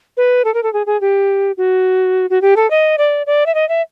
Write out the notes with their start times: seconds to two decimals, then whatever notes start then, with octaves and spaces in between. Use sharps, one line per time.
0.17 B4
0.45 A4
0.54 A#4
0.63 A4
0.73 G#4
0.86 G#4
1.01 G4
1.57 F#4
2.30 F#4
2.42 G4
2.56 A4
2.70 D#5
2.98 D5
3.26 D5
3.46 E5
3.54 D#5
3.69 E5